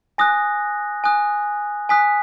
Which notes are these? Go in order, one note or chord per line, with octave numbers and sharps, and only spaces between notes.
G#5 D#6 F#6 A#6
G#5 D#6 F#6
G#5 D#6 F#6 B6